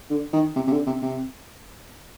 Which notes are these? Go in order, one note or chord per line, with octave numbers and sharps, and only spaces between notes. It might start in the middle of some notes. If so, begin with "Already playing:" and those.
D3
D#3
C3
C3
D3
C3
C3